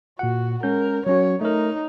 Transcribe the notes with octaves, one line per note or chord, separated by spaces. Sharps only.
A#2 F#4 F#5
G#3 C#4 A#4 G6
F#3 C#4 F#4 C#5
A3 D#4 A#4